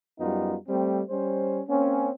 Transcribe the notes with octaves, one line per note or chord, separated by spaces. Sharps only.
F#2 G3 B3 D#4 F4
G3 A3 C4
G3 C#4 C5
A#3 C4 C#4